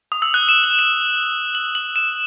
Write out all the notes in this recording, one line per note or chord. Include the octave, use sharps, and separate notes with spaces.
D#6
E6
F#6
E7
F#7
E7
F#7
F#7
E7